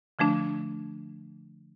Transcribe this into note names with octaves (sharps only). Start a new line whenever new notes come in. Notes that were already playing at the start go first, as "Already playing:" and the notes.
D3 F3 A3 D4